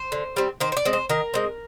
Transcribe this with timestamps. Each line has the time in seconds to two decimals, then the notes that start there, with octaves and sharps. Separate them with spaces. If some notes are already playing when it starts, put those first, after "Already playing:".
Already playing: C5
0.12 D3
0.36 G3 C4
0.60 D#3 C5
0.72 C5
0.77 D5
0.85 G#3 C4
0.93 C5
1.09 D#3 A#4
1.34 G#3 C4